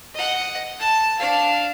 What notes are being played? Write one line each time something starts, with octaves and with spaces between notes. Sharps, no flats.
D#5 F#5
A5
D4 F5